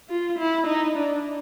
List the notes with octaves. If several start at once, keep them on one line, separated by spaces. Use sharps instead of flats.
F4
E4
D#4
D4